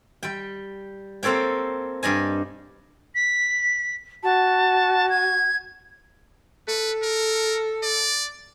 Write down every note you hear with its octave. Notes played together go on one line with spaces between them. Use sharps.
G3 G5
A#3 C4 A4 C#5 G5
G2 D5 D#5 G#5
B6
F#4 A5
G#6
A4 B4
A#4
D5